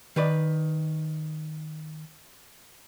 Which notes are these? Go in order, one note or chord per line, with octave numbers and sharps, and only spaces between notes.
D#3 B4 D5